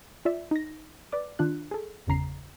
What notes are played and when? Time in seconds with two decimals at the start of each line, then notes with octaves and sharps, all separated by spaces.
0.25 F4 D5 E5
0.51 D#4 A#6
1.12 B4 D5 D6
1.39 D#3 D4 F4 F#6
1.71 G#4 A4
2.07 G1 E2 C#3 A#5 C7